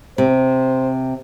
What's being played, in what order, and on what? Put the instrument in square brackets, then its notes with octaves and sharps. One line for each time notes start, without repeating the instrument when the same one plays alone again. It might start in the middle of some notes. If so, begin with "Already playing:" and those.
[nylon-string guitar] C3 [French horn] C5